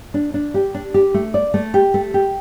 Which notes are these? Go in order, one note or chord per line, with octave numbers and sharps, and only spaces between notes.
D4
D4
G4
D4
G4
A3
D5
A3
G4
A3
G4